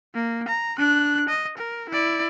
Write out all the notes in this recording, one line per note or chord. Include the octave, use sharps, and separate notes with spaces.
A#3
A#5
D4 F#6
D#5
A#4
E4 D5